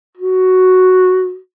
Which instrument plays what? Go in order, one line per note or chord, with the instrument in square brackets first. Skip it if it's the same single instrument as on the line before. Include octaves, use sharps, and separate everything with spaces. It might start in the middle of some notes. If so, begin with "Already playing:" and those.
[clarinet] F#4